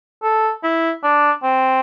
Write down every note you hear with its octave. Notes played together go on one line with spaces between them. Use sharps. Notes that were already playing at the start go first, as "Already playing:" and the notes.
A4
E4
D4
C4